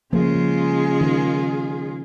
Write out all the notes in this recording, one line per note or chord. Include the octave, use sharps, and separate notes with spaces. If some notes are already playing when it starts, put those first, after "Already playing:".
C#3 F3 G#3 A#3 F4 G#4
F3
D#3